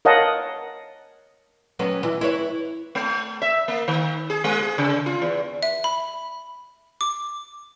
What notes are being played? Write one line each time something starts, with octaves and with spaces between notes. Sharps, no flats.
A#4 C#5 D#5 F5 F#5 A5
F#3 B3 C#4
E3
E4 B4 C#5
A3
E5
A#3
D#3
G#4
G#3
G#4
C#3
F4
E2
E5
B5
D6